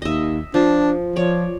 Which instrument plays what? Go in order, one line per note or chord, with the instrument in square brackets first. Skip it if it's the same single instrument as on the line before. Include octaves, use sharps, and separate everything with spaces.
[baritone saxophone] D#2 [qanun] D#5 E5
[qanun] F3 [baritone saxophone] D4
[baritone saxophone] F3 [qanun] C#5 D5